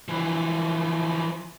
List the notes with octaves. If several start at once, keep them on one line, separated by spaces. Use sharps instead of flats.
E3 F3